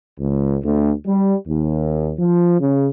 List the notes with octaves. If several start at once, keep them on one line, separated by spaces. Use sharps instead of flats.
C#2
D2
G3
D#2
F3
C#3